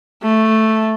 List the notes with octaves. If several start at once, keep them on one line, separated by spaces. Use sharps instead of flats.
A3